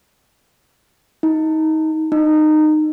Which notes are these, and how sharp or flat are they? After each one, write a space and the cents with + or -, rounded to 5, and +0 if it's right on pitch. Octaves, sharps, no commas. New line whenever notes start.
D#4 +25
D#4 -20